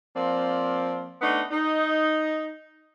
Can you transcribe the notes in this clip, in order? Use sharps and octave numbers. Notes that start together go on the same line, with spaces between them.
F3 A#3 C4 D5
A3 B3 D4 D#4
D#4